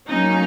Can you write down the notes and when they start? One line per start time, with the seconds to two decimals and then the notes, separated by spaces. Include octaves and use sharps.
0.08 F#3 A#3 C#4 D#4